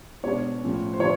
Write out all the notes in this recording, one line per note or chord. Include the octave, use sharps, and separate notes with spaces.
B2 G#3 B3 D4 C#5
A2 F3 A3 C#4
C5
D3 F3 C#5